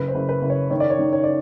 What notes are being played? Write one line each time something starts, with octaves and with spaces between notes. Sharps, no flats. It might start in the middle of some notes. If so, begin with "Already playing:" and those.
Already playing: F#1 B4
C5
F#1
B4
F#1
C#5
D#3 C#5
D5
C#5
D#3
C#5
D5